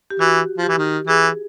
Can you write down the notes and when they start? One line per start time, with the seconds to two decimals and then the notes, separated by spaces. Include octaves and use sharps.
0.10 G4
0.19 E3 F#4
0.58 F3
0.63 G4
0.68 E3
0.78 D#3
1.08 E3 G#4